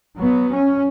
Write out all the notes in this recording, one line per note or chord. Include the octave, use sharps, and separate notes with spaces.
F#3 B3
C#4